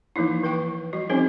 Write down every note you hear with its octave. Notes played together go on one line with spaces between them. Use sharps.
E3 F3 A#3 D#4 E4
E3 B4 G5 C#6
G3 F#4
F3 C4 C#4 D#4 G#4 C5